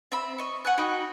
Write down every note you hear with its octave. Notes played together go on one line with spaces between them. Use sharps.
C4 E5 B5
D#5 C#6
F#5 G#5 F#6
D#4 F#4 G5 B5